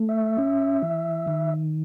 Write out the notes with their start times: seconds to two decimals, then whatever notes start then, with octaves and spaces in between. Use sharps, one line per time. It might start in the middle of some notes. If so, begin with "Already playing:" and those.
Already playing: A3
0.09 E5
0.38 C#4
0.82 E3
1.27 D#3